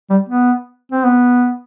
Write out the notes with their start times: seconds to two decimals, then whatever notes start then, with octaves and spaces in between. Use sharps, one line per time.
0.10 G3
0.29 B3
0.92 C4
1.04 B3